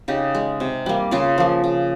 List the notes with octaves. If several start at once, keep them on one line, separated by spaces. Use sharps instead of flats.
C#3 D#4 G4
G#3
C3
G3 A#3
C#3 F4 G#4
F3 A#3
C#3